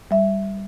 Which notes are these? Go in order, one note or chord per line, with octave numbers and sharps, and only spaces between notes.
G3 E5